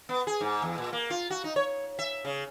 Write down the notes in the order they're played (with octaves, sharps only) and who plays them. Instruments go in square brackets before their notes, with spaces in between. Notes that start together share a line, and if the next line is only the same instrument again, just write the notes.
[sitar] B3
G#4
G#2
E2
A#2
A#3
F4
F#4
D#4
C#5
E5
C#3